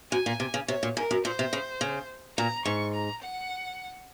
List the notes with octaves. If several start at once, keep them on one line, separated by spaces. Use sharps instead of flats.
F#2 G#5
A#2
C3
C#3
C3 C#5
A#2
G#2 A#4
F#2
A#2 C5
C3
C#3
C#3
A#2 A#5
G#2 C#6
A#5
F#5